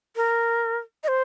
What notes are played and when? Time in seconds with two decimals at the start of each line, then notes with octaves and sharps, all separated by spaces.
0.16 A#4
1.04 D#5
1.08 C5